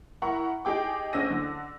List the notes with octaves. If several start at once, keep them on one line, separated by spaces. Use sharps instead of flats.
E4 A#4 F#5 A#5 C#6
D#4 G4 G#4 G5 D6
D2 C#4 D#5 E6 A#6 D#7
D3